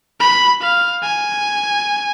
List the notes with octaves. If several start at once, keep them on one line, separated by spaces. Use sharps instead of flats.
B5
F5
G#5